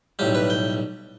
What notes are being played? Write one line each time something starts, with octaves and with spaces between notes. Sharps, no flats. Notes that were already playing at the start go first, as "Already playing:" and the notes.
B1 A2 G3 G4
B4
G5